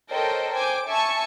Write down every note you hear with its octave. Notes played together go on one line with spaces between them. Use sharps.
A4 A#4 C5 C#5 D#5 G5
C5 G5 G#5 D6
E5 G#5 A5 C#6